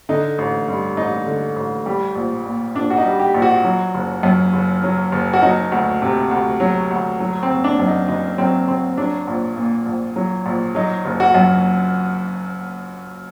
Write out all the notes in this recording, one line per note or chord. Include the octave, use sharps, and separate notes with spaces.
D3 D#4
A1
G2
A1 D#4
D3
A1
G3
A#1
A#2
A#1 D4
F#4
D#4
G3
G4
A#1
F#4
F#3
F#1
F#2
F#1
F#3
F#1
F#4
F#3 D#4
D2
C3
D2
F#3
D2
F#3
C4
F#1
D4
F#2
D#4
F#1 D#4
F#3 C4
F#1 C4
F#3 D4
A#1
A#2
A#1
F#3
A#1
F#3 D#4
F#1
F#4
F#2